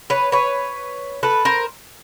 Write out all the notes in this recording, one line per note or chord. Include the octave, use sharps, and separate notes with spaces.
B4 C#5
B4 C#5
A4 B4
A#4 C5